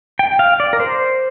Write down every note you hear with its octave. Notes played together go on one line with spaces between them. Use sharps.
G5
F5
D5
A#4
C5